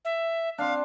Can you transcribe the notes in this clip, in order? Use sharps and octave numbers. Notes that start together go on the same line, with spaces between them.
E5
C4 D4 F5